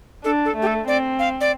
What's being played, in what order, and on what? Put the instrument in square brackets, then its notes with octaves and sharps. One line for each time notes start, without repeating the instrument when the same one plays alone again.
[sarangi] D4 [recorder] A4
[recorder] A4
[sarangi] A3
[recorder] G4
A4
[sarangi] C4 [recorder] D5
[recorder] F5
D5